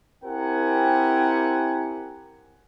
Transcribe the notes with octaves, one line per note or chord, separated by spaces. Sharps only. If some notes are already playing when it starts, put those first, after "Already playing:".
C4 E4 G4 A#4 F#5 G#5